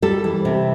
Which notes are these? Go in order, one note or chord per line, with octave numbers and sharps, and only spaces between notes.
G3 A4
E3
C3